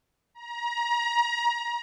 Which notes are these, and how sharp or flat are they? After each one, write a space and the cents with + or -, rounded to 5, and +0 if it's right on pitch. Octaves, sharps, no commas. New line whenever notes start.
A#5 +30